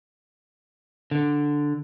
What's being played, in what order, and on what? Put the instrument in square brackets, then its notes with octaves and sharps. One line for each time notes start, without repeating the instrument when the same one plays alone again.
[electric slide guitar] D3